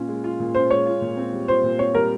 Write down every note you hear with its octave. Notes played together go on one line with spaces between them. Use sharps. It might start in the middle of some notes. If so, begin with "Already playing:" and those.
Already playing: A#2 C#4 F4
G#3
F4
A#2
C#4 C5
G#3 C#5
F4
A#2
C4
G3
F4 C5
A#2
C4 C#5
G3 A#4